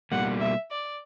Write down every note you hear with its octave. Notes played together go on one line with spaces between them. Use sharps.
B2 G3 A#3 F#5
E5
D5